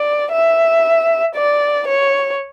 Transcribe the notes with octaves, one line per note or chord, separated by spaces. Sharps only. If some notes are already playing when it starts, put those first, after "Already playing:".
Already playing: D5
E5
D5
C#5